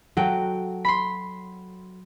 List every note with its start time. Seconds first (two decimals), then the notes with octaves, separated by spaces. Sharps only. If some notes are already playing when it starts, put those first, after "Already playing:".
0.17 F#3 F#4 A4 G5
0.85 B5 C6